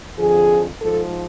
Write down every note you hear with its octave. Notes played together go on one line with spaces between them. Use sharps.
F2 D3 F3 G#4
G#2 F3 A4